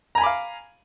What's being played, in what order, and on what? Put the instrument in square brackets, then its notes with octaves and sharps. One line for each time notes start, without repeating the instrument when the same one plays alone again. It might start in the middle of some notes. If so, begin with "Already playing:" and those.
[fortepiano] A#5
G#5
B5
D6
F5